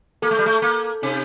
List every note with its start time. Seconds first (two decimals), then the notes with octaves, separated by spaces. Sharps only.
0.22 A#3 A4
0.31 A3
0.39 G3
0.46 A3
0.62 A#3 A4
1.02 C3 D#4